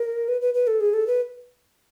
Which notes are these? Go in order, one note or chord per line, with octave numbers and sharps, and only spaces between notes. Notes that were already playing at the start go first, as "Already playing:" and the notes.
Already playing: A#4
B4
B4
B4
A4
G#4
A4
B4